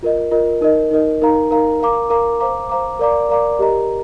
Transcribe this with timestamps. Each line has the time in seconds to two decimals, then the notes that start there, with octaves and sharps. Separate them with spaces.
0.03 F4 A#4 D#5
0.31 F4 A#4 D#5
0.61 D#4 A#4 D#5
0.91 D#4 A#4 D#5
1.22 D#4 A#4 F5 A#5
1.51 D#4 A#4 F5 A#5
1.80 A#4 F5 A#5 D6
2.10 A#4 F5 A#5 D6
2.40 C5 F5 A#5 D6
2.69 C5 F5 A#5 D6
2.99 A#4 D5 F5 A#5 D6
3.29 A#4 D5 F5 A#5 D6
3.59 G4 A#4 D#5 A#5